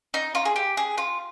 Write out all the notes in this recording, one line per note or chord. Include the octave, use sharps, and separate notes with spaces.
D#4
F4
G#4
G4
G#4
F4